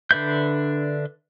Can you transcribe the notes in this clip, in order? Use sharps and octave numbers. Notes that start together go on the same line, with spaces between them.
D3 D4 B4 E5 G6